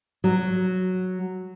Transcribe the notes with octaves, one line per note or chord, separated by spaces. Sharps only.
F#3